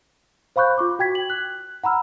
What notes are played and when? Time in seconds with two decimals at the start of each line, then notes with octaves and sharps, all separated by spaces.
0.56 C5 F5 B5 C#6 F#6 G6
0.78 F4 C#6 D6
0.99 F#4 G5 G#6 B6
1.15 F#7
1.30 F#6
1.84 F#5 A#5 B5 E6 F6